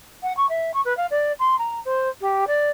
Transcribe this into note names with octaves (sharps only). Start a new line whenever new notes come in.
F#5
C#6
E5
C#6
B4
F5
D5
C6
A#5
C5
G4
D5